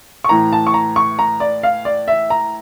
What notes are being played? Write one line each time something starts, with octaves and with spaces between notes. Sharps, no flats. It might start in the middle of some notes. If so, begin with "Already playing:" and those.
C#6
A2 E3 A#5
A5
C#6
A#5
C#6
A#5
D5
F5
D5
E5
A#5